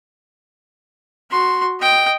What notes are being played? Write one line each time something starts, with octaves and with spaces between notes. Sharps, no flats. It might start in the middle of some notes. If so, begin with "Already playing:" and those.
F#4 C6
D#5 G5